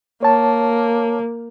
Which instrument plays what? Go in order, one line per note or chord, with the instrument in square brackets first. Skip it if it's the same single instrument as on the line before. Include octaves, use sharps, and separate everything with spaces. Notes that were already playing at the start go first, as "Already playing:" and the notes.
[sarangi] A#3 [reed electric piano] C#5 A5